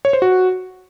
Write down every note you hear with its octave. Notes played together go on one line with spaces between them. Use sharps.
C#5
C5
F#4